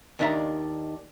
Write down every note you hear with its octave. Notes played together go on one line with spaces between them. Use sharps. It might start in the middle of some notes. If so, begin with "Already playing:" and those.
D#2 D#3 D4 E5 A#5